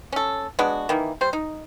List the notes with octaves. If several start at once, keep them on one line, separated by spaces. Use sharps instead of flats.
C#4 A4
G#3 B3 D4 F#4
D#3 E3 A#3
G3 C5
D#4